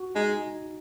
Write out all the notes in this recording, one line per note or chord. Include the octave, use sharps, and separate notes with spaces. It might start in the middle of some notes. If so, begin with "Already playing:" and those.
Already playing: F#4
G#3 D#4